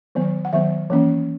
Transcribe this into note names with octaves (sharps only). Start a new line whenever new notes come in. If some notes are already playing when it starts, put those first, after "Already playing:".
D#3 F#3 B3
F#5
D#3 F#3 B3 E5
E3 A#3 C#4